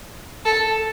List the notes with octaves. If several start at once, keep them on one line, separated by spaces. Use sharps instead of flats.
A4